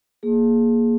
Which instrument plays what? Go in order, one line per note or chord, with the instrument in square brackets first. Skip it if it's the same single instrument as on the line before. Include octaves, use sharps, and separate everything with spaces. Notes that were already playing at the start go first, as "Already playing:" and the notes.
[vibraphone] A#3 G#4